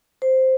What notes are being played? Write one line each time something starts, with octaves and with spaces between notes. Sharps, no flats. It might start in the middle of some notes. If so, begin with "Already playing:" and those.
C5